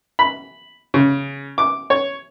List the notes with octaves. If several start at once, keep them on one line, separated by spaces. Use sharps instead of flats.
B5
C#3
D6
C#5